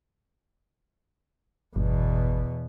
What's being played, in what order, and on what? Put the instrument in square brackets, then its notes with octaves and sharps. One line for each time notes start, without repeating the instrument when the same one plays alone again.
[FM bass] G1 [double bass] E2 B2